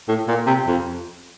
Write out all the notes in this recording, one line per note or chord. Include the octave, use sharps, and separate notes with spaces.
A2
A#2
C3
F2